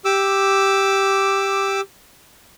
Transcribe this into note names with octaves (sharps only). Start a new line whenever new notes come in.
G4 D6 E6